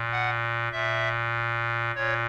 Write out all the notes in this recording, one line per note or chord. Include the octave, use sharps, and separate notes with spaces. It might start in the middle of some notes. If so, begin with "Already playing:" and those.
Already playing: A#2
F#5
A#2 E5
A#2 C#5